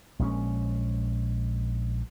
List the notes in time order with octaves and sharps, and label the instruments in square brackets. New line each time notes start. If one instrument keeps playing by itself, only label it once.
[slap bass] A#1 G#3 C#4